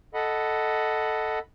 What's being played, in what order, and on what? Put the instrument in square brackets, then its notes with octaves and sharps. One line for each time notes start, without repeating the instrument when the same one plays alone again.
[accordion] A4 D#5 F#5 B5